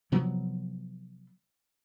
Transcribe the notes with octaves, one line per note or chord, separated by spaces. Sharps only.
C3 F3 F#3 B3